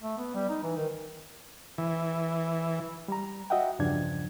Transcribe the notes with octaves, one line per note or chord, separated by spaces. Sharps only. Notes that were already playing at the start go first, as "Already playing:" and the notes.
A3
B3
G3
D#4
E3
D#3
E3
G3 A#5
F#4 D#5 E5 F#5 G5
E2 G2 C#3 F3 D4 G#6